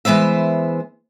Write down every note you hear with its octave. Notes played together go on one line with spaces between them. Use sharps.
E3 G#3 B3 C5 E5